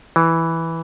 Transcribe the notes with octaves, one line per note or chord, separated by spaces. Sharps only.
E3